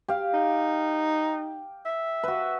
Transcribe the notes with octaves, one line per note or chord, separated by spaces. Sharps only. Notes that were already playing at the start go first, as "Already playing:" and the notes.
G4 F5
D#4
E5
F#4 B4